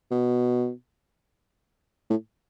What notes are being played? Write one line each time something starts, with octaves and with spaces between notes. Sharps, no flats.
B2
A2